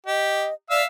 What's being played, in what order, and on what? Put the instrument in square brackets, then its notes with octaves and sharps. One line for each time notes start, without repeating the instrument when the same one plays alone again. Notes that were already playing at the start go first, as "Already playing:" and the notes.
[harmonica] G4 [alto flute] D#5
[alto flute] D5 [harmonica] E5 F5 E6